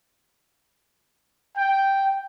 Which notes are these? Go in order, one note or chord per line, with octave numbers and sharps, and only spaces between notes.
G5